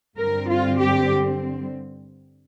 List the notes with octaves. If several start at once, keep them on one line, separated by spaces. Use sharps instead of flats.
G2 D3 G3 C4 A#4
F4
G4